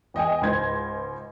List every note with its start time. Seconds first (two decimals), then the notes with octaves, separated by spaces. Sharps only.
0.14 E2 D#5 G5 G#5
0.42 C#2 G#2 C5 G#6 A#6